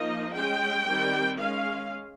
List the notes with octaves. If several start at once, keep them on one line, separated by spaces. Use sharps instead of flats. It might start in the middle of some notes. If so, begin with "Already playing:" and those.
Already playing: F3 A#3 D#4 D#5
G#3 C#4 G5
D#3 G3 C4
G#3 C#4 F5